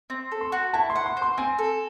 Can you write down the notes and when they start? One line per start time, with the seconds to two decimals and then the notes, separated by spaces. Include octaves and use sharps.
0.10 C4
0.32 A4
0.41 C6
0.52 F#4
0.73 E4 A5
0.90 C6
0.95 F#5
1.06 C6
1.17 C5
1.22 C6
1.37 C4 G#5
1.58 A4